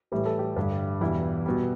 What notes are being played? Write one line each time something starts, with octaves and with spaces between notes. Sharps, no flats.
A2 E3 G3 G4
A4
G4
G2 D3 G3
E2 B2 G3 E4
B2 G3